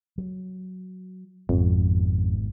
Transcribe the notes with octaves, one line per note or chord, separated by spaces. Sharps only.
F#3
G#1 F2 G#2 B2